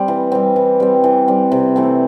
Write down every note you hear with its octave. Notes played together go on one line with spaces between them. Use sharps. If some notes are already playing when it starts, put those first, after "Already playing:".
Already playing: G3 C4
E3
G3 C4
E3
G3 C4
E3
G3 C4
C3
E3 A3 C4